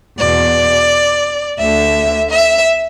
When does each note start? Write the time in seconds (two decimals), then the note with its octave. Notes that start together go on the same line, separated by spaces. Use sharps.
0.17 E2 B2 D5
1.59 D2 D3 E5
2.30 E5